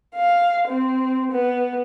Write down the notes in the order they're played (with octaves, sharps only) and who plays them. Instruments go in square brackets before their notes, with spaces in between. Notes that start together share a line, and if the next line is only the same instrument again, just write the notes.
[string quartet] F5
C4
B3